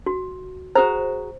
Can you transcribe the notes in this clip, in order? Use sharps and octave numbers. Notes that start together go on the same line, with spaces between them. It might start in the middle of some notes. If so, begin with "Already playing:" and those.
F#4
F#4 G#4 C5 A#5